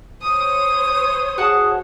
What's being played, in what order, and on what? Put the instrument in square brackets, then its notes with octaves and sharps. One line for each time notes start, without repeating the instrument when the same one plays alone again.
[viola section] C5 C#5 [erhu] D#6
[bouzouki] F#4 F#5 A5 [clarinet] G#4